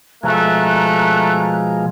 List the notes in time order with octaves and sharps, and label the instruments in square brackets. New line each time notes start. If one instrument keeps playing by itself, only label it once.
[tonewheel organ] B2 F3 G#3 [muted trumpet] A3 [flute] A#5 [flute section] F#6